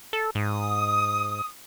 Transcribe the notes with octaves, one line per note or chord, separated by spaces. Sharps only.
A4
G#2 D#6